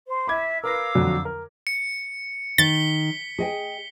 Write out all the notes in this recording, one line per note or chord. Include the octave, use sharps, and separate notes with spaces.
C5
E5 B5 D6 G#6
A#4 B4 F5 D6 E6 A#6
F2 D3 F#3
A#4
C#7
D#3 A6 B6 G7
G#4 D#5 G5